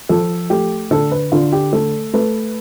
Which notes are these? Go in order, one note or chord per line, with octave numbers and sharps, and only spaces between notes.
F3 A4
A3 G4
D3 A4
B4
D3 F4
G4
A3 A4
A3 B4